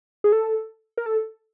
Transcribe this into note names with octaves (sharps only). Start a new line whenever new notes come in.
G#4
A4
A#4
A4